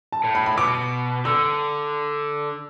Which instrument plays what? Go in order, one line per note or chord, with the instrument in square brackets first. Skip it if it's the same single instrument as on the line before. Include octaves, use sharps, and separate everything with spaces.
[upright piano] A5
[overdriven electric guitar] A2
[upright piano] B5
B5
[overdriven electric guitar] B2 [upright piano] D6
[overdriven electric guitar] D3 [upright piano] E6